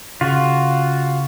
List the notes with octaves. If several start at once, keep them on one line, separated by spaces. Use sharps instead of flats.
C#3 F4 F#4